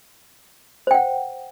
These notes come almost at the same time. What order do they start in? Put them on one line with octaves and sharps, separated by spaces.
C5 G5 F#5